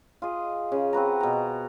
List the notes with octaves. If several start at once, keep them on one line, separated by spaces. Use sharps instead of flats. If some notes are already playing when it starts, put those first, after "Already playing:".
F4 G#4 D#5
C#3
C4 F#4 B4 A#5
B2 A#5